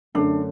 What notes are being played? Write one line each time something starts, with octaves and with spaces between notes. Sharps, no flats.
F#2 D3 A3 C#4 D4